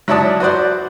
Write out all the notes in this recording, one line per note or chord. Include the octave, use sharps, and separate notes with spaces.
F#3 E4 C#5 D5 A5 D#6
F#4 B4 C5 D5